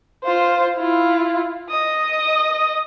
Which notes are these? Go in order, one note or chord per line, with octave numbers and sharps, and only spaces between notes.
F4 C5
E4 F4
D#5 D#6